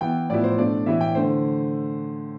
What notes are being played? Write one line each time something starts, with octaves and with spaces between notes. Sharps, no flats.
E3 B3 E4 G5
A2 F3 B3 E4 D5
C5
B2 A3 D4 D5
A2 E3 B3 E4 E5
G5
D3 A3 D4 C5